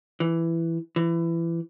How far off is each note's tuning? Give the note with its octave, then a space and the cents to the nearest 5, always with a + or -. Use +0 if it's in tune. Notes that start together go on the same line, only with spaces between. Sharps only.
E3 +10
E3 +25